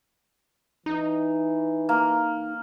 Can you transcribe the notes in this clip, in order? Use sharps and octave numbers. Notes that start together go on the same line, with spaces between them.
E3 D#4
A#3